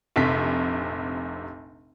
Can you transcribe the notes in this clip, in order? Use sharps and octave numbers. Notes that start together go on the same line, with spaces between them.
F1 A#1 C3 B6